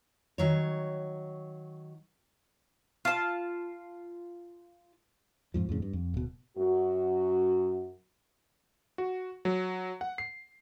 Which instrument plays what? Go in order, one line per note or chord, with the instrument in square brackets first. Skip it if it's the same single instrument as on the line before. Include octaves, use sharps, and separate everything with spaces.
[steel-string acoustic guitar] D#3 F#3 C#5
[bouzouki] F4 A5
[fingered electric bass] F2 G#2 F3
F2 A2 C#3
G2
F2
D1 B2
[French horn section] F#2 F#4
[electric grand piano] F#4
F#3
F#5
C7